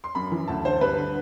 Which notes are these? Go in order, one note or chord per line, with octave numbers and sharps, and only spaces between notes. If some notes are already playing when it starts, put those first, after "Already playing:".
C6
F#2 B5
E3
D2 A5
D3 C5
G2 B4
D3